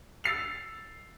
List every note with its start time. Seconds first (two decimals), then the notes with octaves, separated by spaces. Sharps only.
0.24 E6 A6 C7 F7